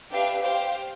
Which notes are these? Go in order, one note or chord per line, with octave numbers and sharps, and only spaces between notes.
D4 G4 B4 E5 F5
G4 C5 F5 G5